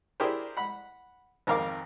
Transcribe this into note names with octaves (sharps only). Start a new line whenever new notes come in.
D4 E4 G4 G#4 A#4 C5
F#5 B5
G#1 F2 D#3 A#4 F5 D6